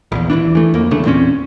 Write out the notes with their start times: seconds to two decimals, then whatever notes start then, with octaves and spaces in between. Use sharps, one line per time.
0.12 A#1 E2
0.30 D#1 G#1 E3 D4
0.55 E3 A3
0.74 F2 A#3
0.91 E1 C#3 A3 D4
1.05 E2 A#2 C4 C#4